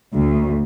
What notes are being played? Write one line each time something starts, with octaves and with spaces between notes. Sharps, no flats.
D2